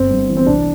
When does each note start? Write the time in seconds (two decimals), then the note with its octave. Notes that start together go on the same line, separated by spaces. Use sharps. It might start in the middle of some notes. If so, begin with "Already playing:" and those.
Already playing: G1 C4
0.10 G2
0.28 E3
0.37 C4
0.47 C2 D4